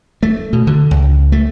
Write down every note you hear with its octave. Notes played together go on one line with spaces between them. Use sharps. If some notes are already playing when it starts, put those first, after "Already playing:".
A3
B2
D3
C#2
A3